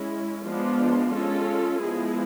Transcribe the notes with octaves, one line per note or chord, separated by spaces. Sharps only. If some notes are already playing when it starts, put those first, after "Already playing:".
Already playing: G#3 C#4 E4
F3 G#3 B3 D4 F4
G#3 C#4 F4 A4
F3 G#3 B3 E4 G#4